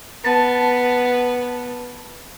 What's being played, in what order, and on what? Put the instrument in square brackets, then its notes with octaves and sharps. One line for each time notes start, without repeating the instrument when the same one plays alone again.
[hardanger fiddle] B3 [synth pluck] A5